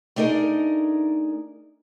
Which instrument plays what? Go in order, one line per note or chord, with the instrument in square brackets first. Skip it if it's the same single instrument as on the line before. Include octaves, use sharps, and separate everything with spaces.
[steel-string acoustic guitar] A3 D4 D#4 G#4 A#4